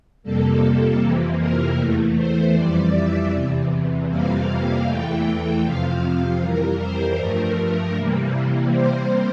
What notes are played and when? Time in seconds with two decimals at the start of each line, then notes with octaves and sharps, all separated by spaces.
0.23 F2 C3 G3 A#3 A4
1.00 F2 C3 E3 A#3
1.39 A#4
1.78 E2 E3 A3
2.16 C5
2.54 F2 E3 G3 D5
2.93 E5
3.32 E2 C3 E3
4.09 F2 C3 E3 G3 A#3 F5
4.48 F5
4.86 E2 E3 A3 G5
5.64 F2 C3 F3 F5
6.40 F2 E3 G3 A#4
6.78 C5
7.17 G2 F3 A3 A#4
7.56 A#4
7.95 C3 E3 G3 A#3
8.71 C3 G3 A#3 C5